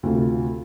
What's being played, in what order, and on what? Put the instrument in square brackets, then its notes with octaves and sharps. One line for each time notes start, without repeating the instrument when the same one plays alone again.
[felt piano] D2 C3 A3 F4